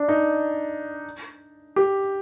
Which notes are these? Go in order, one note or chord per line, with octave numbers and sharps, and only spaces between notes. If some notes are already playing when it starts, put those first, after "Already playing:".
Already playing: D4
D#4
G4